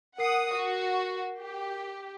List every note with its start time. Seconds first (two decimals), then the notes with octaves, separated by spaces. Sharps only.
0.18 A#4 F#5 D#6 C7
0.54 F#4
1.40 G4